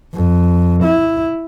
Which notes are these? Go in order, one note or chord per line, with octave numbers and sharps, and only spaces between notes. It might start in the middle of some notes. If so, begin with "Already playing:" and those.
F2
E4